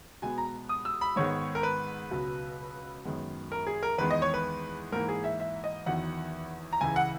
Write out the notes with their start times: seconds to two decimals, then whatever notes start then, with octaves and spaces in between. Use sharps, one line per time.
0.22 B2 G#3 B3 G#5
0.38 A#5
0.69 D#6
0.85 E6
1.01 B5
1.16 G#2 D#3 G#3 B3 C#5
1.55 A#4
1.63 B4
2.11 C#2 B2 F#3
3.05 F#2 D#3 G#3 B3
3.52 A#4
3.67 G#4
3.83 A#4
3.98 E2 D#3 G#3 B3 B4
4.11 D#5
4.22 C#5
4.34 B4
4.92 G#2 E3 A#3 A#4
5.09 G#4
5.24 E5
5.40 E5
5.64 D#5
5.86 E2 D#3 F#3 B3 F#5
6.73 A#5
6.81 C#2 C#3 E3 G#5
6.96 F#5